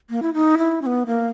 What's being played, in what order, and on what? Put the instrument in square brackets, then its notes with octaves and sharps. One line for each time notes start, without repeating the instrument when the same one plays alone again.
[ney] A#3
E4
D#4
E4
C#4
B3
A#3